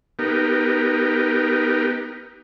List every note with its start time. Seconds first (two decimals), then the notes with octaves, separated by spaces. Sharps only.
0.19 B3 D#4 G4 A#4